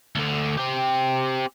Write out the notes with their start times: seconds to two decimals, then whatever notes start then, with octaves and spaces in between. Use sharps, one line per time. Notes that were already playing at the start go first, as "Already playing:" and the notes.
0.15 D2 D3
0.57 C4 G4